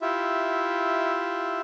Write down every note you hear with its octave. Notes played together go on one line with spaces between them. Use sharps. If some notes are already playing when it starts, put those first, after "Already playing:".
E4 F4 G4 E5